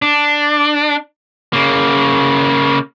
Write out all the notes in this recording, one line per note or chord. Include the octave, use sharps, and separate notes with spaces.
D4
C#3 A#3